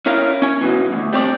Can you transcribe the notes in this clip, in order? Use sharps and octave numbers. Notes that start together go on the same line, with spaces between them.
C#4 E4 A#4 F5
C#4 G#5
G#2 B2 E3
D2 G#2
G3 C4 C#5 D5